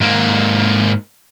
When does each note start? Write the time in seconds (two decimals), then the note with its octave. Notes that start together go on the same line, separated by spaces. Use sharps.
0.01 G#2 A#3